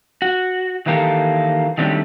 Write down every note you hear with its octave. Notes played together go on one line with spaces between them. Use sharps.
F#4
D#3 E3 A#3 G4 A4
D#3 F#3 G3 A3 C4 D4